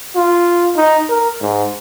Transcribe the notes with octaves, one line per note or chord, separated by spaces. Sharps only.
F4
D#4
A#4
G#2